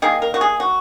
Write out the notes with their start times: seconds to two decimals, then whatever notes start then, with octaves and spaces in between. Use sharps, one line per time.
0.02 D#3 A#3 G#4
0.22 A#4
0.34 F#4
0.41 G#4
0.60 F#4